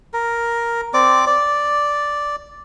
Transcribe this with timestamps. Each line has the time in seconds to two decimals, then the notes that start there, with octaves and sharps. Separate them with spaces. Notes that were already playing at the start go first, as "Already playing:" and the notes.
0.14 A#4
0.94 C4 D5 D6
1.27 D5